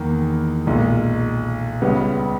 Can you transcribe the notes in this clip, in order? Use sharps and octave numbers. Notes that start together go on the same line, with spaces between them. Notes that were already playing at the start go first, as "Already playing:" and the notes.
Already playing: E2 D#3 A#3
B1 A#2 G#3
C#2 C#3 G3 B3